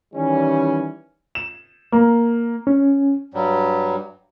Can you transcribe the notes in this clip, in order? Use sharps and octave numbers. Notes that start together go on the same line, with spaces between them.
D#3 E3 G3 C#4
E7
A#3
C#4
G2 F#3 G3